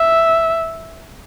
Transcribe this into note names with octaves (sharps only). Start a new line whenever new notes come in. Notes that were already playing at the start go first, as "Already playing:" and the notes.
Already playing: E5